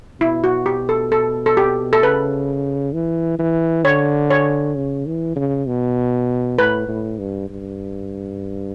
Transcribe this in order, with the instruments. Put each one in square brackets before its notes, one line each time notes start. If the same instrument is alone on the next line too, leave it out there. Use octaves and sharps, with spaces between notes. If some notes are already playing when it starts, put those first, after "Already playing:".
[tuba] B2 [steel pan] E4
[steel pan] F#4
G4
A4
A4
A4
G4
A4
[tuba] C#3 [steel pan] B4
[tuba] E3
E3
[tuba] D3 [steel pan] C#5
[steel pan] C#5
[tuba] C#3
E3
C#3
B2
[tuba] A2 [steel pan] B4
[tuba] A2
G2
G2